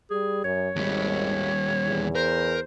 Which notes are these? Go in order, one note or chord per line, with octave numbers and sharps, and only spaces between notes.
G3 G#4
F#2 C#5
G#1 D#2 G3
E2
A#4 C5